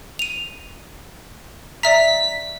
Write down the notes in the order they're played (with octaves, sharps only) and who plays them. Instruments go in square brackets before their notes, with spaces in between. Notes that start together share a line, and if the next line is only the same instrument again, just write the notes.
[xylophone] D#7 F7
[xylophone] D5 E5 A#5 [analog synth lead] B6